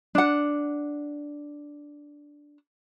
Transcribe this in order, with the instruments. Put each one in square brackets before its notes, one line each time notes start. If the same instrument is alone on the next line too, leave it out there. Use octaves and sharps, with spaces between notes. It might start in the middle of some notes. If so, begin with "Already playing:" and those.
[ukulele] D4 F#5